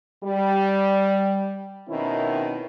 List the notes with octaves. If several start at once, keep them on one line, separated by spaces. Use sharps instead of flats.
G3
B2 D#3 C4 C#4 E4